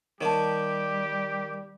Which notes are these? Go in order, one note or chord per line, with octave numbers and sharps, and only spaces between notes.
D#3 G3 A#3 G4 C#5 A5